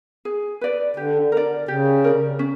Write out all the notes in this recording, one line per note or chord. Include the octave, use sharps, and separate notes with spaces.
G#4
B4 D5
D3 G4
A#4 D5
C#3 G4
A#4 D5
C#4